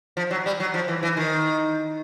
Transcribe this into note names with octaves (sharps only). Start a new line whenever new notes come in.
F3
F#3
G3
F#3
F3
E3
E3
D#3